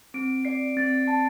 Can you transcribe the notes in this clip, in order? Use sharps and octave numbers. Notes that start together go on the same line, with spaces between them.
C4 D7
D5 C7
C4 A6
A5